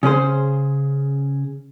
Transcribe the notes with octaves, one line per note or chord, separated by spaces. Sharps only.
C#3 C#4 G#4 C5